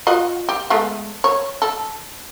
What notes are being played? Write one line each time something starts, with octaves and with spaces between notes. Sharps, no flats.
F4 F#4 D#5
G4
G#3 A3 B3
C#5
A4